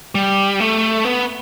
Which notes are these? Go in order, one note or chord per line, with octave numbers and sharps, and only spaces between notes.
G3
A3
B3